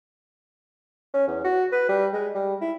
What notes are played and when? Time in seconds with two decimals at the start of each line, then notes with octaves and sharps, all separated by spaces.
1.14 C#4
1.27 E2
1.44 F#4
1.72 B4
1.89 G3
2.13 G#3
2.35 G3
2.61 E4